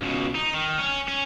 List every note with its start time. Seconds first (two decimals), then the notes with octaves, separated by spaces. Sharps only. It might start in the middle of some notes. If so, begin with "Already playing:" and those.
0.02 C#2 B2
0.35 D#4
0.54 D#3
0.79 C#4
1.08 C#4